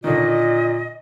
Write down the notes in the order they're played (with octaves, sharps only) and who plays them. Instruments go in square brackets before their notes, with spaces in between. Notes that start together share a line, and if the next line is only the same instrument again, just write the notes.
[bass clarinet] A#2 [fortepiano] D3 D#3 [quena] D#5